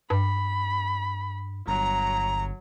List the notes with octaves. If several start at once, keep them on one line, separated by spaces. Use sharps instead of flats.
G2 B5
G1 F#3 A#5